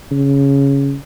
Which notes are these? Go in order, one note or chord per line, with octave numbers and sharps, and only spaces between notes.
C#3